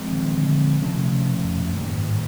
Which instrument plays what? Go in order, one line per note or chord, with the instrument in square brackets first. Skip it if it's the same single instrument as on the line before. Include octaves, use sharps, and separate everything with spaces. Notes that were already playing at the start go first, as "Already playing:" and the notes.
Already playing: [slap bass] A#2 F3 G#3 C4
[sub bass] D#3
D3
[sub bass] C#3 [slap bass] F3 A3 C#4
[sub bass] C3
C3
B2
F2
F#2
[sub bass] F#2 [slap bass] D#3 G3 A#3
[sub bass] G#2
A2